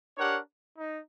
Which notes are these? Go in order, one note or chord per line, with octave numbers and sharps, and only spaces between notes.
D4 G4 A#4 C#5 F#5
D#4